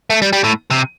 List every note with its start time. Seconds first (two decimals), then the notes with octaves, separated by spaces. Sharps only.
0.10 A3
0.22 G3
0.33 G3
0.44 A2
0.70 C3